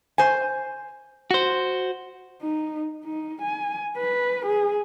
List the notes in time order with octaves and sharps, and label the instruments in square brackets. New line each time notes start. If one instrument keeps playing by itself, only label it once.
[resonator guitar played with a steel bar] C5 G#5
[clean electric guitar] F#4 C5
[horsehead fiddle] D#4
D#4
G#5
B4
G#4